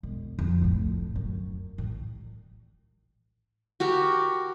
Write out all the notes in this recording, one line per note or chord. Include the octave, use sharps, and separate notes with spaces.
E1
F2
F1 A2
F#2
A1
F#4 G4 A#4